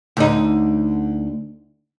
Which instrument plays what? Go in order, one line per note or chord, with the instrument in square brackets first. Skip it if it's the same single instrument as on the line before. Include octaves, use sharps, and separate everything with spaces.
[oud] D2 D#4